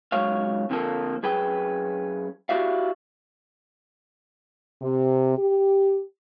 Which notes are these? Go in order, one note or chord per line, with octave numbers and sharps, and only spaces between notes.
C#2 G#2 F#3 C#5 F5
F2 D3 F3 A#3 A4
F#2 G#4 B4 G5
E4 F#4 G4 D5 E5 F5
C3
G4